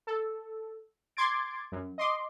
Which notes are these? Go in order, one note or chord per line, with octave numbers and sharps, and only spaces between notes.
A4
C6 D6 G#6 A6 D7
F#2
D#5 C6 D6